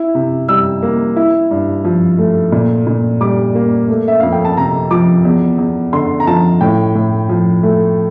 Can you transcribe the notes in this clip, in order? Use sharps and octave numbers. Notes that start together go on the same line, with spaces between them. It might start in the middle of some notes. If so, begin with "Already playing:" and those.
Already playing: E4
C3
G3 E6
A#3
E4
G2
F3
A3
A#2
A#2
G3 D6
A#3
A3
E5
F2 F5
G5
A5
C3 A#5
F3 D6
E2
E2
D3 C6
A#5
F3 A5
A2 G5
A2
F3
A3